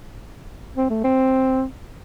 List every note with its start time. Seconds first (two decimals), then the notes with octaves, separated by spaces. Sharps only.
0.76 C4
0.90 A3
1.04 C4